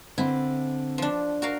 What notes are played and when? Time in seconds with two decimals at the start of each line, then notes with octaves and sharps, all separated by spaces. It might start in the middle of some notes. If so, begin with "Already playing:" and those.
0.18 D3 C4 E4
0.98 F3 D4
1.42 F#4 A#4 F5